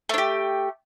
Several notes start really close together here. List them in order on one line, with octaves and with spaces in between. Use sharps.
A3 D4 G4